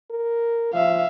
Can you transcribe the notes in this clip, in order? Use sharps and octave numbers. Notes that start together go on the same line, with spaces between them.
A#4
F3 E5 F5